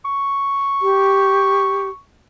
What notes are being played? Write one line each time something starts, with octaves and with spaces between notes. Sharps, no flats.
C#6
G4